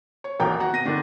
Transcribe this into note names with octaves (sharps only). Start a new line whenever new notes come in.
C#5
D#1 A1 F#4 A#4 G5 A#5
F#4 F#5 A#5
B2 A#6 D#7
D3 D#3 D4